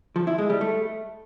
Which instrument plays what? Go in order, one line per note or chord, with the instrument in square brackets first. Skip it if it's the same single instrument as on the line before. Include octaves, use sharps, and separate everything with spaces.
[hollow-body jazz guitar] F3
E4
G#3
G3
A3